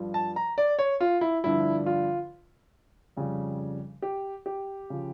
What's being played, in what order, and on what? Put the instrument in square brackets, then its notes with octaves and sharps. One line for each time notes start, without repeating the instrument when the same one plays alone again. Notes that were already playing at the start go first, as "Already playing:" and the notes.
Already playing: [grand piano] G2 F3
A5
A#5
D5
C#5
F4
E4
G2 D3 F3 E4
F4
F2 C#3 G3
G4
G4
C#3 F3